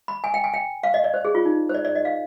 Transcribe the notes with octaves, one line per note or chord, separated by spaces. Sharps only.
B5
G#5
G5
G#5
G5
F5
D#5
D5
C5
G#4
F4
D#4
C5
D5
D5
D#5
F5